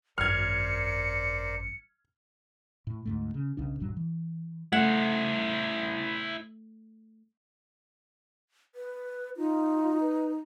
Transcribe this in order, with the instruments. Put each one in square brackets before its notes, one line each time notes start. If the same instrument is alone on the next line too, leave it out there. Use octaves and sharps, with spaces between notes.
[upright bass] G#1 F#2 [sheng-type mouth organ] A#4 C5 D5 [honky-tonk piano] F6 G#6 [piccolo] C#7
[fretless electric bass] A2
D2 G#2 A3
C#3
B1 C#3 D4
D1 A#1 G2 F#3
E3
[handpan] A3 [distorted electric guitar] E4 C5 [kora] F#5
[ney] B4
[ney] D#4 [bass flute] F4
[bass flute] B4